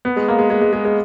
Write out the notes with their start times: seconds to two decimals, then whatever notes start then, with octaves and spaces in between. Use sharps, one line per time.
0.05 B3
0.16 G#3
0.28 A#3
0.39 G#3
0.50 G#3
0.61 G#3
0.73 G#3
0.85 G#3